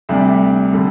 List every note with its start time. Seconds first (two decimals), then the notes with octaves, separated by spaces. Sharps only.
0.09 D2 C3 G3 D4
0.73 D3 G3